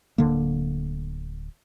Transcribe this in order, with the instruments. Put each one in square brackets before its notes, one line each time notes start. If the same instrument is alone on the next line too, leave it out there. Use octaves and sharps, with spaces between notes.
[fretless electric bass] D1 D3 A#3